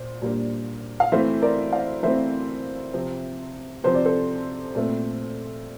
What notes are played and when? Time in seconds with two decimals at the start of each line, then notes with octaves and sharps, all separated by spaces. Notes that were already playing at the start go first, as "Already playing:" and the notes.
Already playing: A#2 C5
0.22 A#2 G3 A#3 D4
1.00 F5
1.12 E3 A3 C4 C5 E5
1.42 A#4 D5
1.72 D5 F5
2.03 E3 A3 C4 C5 E5
2.94 C3 F3 C4
3.84 C3 F3 C4 C5
3.95 D5
4.05 A4 C5
4.75 A#2 A3 C4